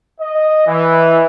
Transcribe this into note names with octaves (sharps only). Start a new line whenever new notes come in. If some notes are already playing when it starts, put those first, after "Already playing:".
D#5
E3